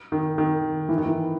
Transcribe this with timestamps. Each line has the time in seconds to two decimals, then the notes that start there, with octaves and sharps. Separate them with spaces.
0.12 D#3
0.38 D#3
0.89 E3
0.98 D#3
1.06 E3